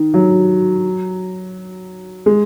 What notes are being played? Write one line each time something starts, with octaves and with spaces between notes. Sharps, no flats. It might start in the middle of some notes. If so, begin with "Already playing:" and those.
Already playing: D#3
F#3
G#3